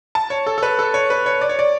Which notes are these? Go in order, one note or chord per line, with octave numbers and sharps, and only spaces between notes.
A5
C#5
A4
A4
B4
A4
C#5
B4
C#5
D5
C#5
D5